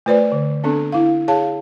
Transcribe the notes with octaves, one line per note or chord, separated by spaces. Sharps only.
A3 F4 B4 C5 D5
D3
B3 C4 D4 A4
E4 F5
G#4 C#5 F5 A5